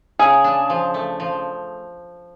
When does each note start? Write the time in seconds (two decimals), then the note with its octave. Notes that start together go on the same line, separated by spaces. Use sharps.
0.19 C#3 G#4
0.44 D4
0.70 F3
0.94 A3
1.20 F3